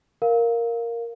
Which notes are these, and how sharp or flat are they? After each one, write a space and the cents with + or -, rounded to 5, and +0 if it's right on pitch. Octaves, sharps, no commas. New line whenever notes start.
A#4 +0 F5 +0